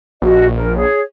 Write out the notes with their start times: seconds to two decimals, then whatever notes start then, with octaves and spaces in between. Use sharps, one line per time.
0.22 A#1 F#4 D#5
0.56 A#4
0.76 G#4 C#5